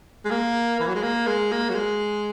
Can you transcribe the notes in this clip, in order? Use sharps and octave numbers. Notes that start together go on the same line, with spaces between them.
G#3
A#3
E3
F#3
G#3
A#3
G#3
A#3
F#3
G#3